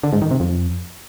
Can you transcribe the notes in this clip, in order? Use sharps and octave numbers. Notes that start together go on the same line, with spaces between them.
D3
G#2
D#3
C3
F2